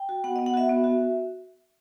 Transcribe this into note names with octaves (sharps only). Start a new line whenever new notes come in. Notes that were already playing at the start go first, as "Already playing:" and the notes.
Already playing: G5
F#4
B3 F#5
B3 D#5
F#5
F#4 E5
B3
F#4